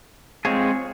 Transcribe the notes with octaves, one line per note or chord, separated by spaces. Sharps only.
G#3 C4 F4 G#4 C#5